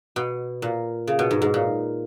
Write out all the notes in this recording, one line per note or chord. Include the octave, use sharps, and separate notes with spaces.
B2
A#2
C#3
B2
G#2
G#2
A#2